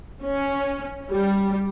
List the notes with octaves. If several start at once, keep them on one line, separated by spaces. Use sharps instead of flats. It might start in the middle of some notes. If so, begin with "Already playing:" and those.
C#4
G3